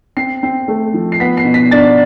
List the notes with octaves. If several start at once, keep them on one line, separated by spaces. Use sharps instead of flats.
C4 C7
C4
A3
F3
C7
B3 B6
C7
B2
B6
D4 A6